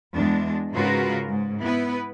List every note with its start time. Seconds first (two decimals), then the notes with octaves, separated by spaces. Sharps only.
0.14 E2 G#3 D4
0.72 G#2 C#3 F4 F#4 A#4 B4
1.27 G#2
1.61 B3 E4 B4